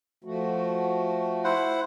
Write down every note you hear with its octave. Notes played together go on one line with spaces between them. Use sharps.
F3 A3 F#4
E4 C5 F#5